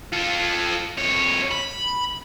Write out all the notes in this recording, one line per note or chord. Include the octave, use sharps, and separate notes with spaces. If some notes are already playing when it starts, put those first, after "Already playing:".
F4 A4
F2 C#5
B5